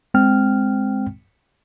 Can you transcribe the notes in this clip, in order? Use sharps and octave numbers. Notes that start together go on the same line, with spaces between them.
G#3 C4 G5 F6